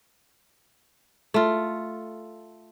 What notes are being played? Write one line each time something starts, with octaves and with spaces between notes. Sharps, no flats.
A3 F4